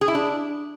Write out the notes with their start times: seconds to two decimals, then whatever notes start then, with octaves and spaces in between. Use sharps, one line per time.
0.01 G#4
0.08 E4
0.15 D4